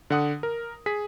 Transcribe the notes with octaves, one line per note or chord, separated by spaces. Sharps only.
D3 F#5 D#6
A#4
G#4 B6